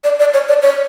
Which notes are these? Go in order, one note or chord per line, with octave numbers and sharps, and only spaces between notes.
D5
D5
C#5
D5
C#5